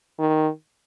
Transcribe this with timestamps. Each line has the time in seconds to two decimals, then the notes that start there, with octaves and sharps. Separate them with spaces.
0.19 D#3